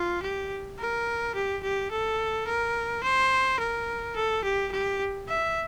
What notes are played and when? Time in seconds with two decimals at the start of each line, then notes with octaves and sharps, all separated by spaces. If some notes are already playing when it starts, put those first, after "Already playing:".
Already playing: F4
0.23 G4
0.79 A#4
1.35 G4
1.63 G4
1.91 A4
2.47 A#4
3.03 C5
3.59 A#4
4.16 A4
4.44 G4
4.72 G4
5.28 E5